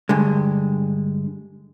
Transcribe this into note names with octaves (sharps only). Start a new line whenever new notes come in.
G2 D3 G#3